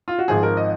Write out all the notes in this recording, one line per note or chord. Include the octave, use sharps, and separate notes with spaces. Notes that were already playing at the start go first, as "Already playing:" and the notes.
F4
F#4
G#1 G#2 F3 G#4
A#4
D#5